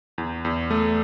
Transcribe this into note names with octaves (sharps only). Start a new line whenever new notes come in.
E2
E2
A3